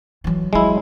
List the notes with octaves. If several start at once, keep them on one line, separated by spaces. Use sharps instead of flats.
E3 F#3
E3 F#3 G#3 E4